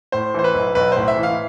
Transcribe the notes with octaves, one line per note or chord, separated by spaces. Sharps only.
A2 C5
E3 C5
B4
B1
B1 B4
A2 C5
E5
E3
F5